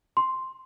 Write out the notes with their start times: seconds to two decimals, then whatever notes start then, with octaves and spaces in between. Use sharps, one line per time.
0.17 C6